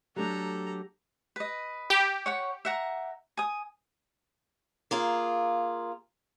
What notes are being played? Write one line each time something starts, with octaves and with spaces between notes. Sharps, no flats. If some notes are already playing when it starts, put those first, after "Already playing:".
F#3 A3 D4 G4 A4 A#5
B4 D#5
G4
C#5 F#5 C#6
E5 F#5 A#5
G#5 D#6
A#3 F4 G#4